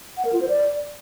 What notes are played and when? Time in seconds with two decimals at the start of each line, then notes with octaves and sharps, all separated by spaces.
0.17 F#5
0.25 A#4
0.33 F4
0.41 C5
0.49 D5